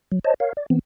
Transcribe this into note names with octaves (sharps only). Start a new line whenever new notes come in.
F#3
C5 C#5 D#5 A5
A#4 C#5 F5
D5
E3 B3 C4